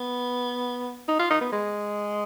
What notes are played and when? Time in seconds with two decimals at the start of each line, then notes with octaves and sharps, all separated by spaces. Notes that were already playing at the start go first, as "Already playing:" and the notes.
Already playing: B3
1.08 D#4
1.19 F4
1.30 D#4
1.41 B3
1.52 G#3